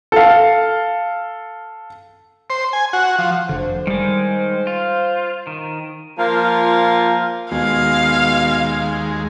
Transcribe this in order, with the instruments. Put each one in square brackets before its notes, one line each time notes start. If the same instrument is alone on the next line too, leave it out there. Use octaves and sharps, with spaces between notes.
[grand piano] A4 F5
[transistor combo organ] C5
G#5
F#4
F3
[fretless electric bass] F1 D3 [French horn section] C5
[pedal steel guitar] D#3 G#3 [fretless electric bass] G3
[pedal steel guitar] F4
D#3
[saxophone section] F3 A#3 F4
[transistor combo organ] D#2 G#3 [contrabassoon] B2 [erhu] F5